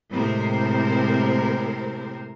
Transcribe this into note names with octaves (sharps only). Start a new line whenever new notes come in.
A2 C3 G#3 C4 A#4 C5